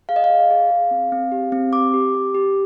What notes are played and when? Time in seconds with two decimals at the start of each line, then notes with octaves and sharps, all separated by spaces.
0.09 G#4 F5
0.16 D#5
0.24 F5
0.30 G#4
0.50 G#4
0.71 G#4
0.91 C4
1.12 C4
1.32 G4
1.52 C4
1.73 G4 D6
1.94 G4
2.15 G4
2.34 G4